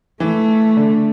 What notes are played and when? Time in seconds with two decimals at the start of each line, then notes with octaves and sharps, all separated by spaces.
0.20 E3 A3
0.77 D3